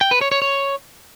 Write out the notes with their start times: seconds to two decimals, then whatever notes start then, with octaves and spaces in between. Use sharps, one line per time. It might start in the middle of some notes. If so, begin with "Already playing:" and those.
0.01 G5
0.11 B4
0.21 C#5
0.32 C#5
0.42 C#5